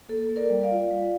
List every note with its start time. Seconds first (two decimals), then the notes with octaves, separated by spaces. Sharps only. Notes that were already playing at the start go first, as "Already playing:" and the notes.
0.09 A#3 A4
0.29 A#3
0.36 A#4 D5
0.50 G3
0.63 D5 F5
0.71 F4
0.91 G3